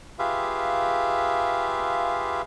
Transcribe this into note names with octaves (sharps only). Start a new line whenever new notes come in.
F4 G4 G#4 B4 E5 F5